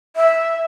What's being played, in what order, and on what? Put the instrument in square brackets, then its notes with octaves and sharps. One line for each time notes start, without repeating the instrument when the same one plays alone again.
[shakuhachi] E5